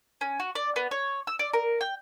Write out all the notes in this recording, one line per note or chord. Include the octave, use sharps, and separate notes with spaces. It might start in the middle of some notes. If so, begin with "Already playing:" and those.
C#4
F#4
D5
B3
C#5
E6
D5
A#4
G5